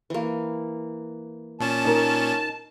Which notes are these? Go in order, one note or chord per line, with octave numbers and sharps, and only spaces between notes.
E3 A#3
A#2 C#4 A5
D#4 A#4